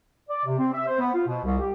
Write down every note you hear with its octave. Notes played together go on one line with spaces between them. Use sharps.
D5
C3
C4
E5
C5
B3
F4
B2
C2
G4